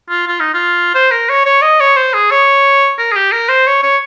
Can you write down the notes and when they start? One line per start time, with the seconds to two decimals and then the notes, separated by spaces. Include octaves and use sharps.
0.10 F4
0.27 F4
0.40 D#4
0.54 F4
0.95 C5
1.12 A#4
1.29 C#5
1.46 C#5
1.62 D#5
1.80 C#5
1.96 C5
2.14 G#4
2.31 C#5
2.99 A#4
3.12 G#4
3.16 G4
3.32 A#4
3.49 C5
3.67 C#5
3.83 C#5